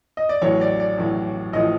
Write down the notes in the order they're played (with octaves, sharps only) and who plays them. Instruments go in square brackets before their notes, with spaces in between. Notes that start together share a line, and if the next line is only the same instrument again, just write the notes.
[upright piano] D#5
D5
A1 A2 F#3 C#5
D5
D5
A1 A2 F#3
A1 A2 F3 D#5